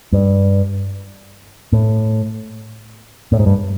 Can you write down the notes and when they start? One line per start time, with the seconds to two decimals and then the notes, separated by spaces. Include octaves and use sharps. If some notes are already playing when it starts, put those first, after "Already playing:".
0.12 G2
1.72 A2
3.32 A2
3.39 G#2
3.46 G2